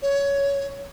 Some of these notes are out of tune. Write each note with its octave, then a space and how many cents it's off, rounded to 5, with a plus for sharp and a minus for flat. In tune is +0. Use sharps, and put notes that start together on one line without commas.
C#5 +15